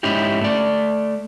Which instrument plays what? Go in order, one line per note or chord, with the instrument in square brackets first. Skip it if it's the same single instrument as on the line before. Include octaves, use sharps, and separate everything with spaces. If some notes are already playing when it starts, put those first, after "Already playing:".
[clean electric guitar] G#2 C#4 D#4 E4 G4
A3 D5